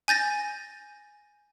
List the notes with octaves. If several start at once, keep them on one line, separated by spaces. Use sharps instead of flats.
G#5 G6 A6 A#6